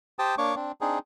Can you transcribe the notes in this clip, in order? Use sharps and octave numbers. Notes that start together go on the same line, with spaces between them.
G4 C5 G5 A5 D#6
A#3 D4 C#5 C#6 D6
C4 D4
C4 D4 D#4 G#4